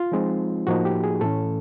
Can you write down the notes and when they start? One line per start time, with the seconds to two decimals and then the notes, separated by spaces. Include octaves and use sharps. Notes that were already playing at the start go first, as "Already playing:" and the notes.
Already playing: F4
0.12 F3 G#3 C4 D#4
0.67 A2 F3 A#3 D#4 F#4
0.85 G4
1.04 G#4
1.21 A2 E3 A3 C#4 A4